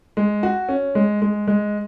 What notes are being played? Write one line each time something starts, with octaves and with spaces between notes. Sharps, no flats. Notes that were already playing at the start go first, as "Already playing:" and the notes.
G#3
F#4
C#4
G#3
G#3
G#3